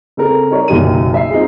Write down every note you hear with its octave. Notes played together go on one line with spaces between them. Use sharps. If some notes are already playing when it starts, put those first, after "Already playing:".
C#3 C4 A4 A#4
D#4 A#4 C#5 D5
F#1 B1 F#2 D#3 G4 D#7
E5 C7
C4 D#4 F4 G#4